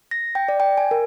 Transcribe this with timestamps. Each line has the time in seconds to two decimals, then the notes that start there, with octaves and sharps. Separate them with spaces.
0.11 A#6
0.35 G5
0.49 D5
0.60 G5
0.77 G#5
0.91 A#4